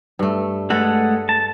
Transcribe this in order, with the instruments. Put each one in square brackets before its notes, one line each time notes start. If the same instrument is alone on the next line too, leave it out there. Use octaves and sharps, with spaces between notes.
[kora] G2 A3
[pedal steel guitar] G#3 A3 F#5 [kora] A4 B4
[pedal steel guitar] A5